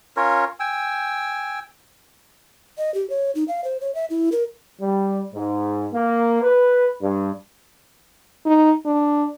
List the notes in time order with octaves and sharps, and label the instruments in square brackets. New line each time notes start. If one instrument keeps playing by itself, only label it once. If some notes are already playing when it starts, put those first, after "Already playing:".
[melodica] C#4 F4 A#4 C#5
G5 G#5 E6
[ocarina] D#5
G4
C#5
D#4
F5
C5
C#5
E5
E4
A#4
[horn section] G3
G#2
A#3
B4
G2
[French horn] D#4
D4